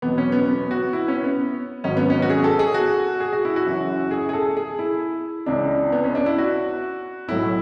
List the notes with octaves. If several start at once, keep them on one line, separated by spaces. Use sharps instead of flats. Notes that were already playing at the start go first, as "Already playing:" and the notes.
E2 B2 F#3 B3
C#4
B3
B3
F#4
E4
C#4
B3
G#1 G#2 F#3 C#4
B3
C#4
F#4
G#4
A4
G#4
F#4
G#4
F#4
E4
F#4
F#1 F#2 E3
G#4
G#4
A4
G#4
E4
C#2 C#3 E3 D4
B3
C#4
D4
E4
F#4
B1 A2 F#3 E4